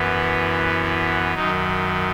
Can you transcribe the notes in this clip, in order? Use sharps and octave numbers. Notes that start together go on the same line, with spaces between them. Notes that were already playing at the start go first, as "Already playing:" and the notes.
Already playing: F#2 E3 B3
F#2 D#3 F#3 D#4